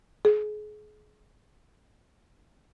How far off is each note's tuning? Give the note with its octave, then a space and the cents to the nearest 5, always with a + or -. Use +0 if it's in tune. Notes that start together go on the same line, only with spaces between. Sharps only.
G#4 +30